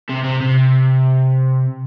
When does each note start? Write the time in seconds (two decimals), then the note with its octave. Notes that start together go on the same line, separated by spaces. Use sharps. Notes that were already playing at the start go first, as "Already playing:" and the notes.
0.10 C3
0.24 C3
0.41 C3